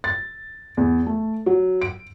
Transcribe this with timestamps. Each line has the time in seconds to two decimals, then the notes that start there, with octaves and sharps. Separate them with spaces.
0.04 A6
0.77 E2
1.06 A3
1.46 F#3
1.82 D7